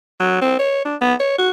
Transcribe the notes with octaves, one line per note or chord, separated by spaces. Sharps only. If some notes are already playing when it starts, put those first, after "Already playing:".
F#3
C4
C#5
D4
B3
C#5
F#4